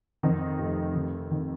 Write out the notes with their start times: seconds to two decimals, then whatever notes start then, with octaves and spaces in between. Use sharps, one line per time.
0.23 F2 D#3 D#4
0.59 F1
0.95 D#3
1.31 D#3